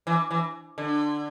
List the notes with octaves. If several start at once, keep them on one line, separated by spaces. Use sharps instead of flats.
E3
E3
D3